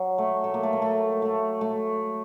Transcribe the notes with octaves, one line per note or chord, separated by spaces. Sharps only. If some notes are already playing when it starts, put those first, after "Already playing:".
Already playing: F#3
A3
A3
A#3
A3
A#3
A3
A3
A3